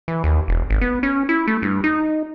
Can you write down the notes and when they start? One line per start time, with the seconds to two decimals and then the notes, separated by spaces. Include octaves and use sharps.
0.08 E3
0.24 D#2
0.48 E1
0.70 G#1
0.81 B3
1.03 C#4
1.29 E4
1.47 A3
1.62 G2
1.84 D#4